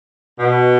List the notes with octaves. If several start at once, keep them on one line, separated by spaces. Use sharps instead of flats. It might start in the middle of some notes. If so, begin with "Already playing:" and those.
B2